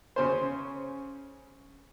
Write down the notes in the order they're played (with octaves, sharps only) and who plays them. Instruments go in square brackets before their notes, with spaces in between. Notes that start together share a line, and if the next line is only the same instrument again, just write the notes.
[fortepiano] C#3 C#4 C5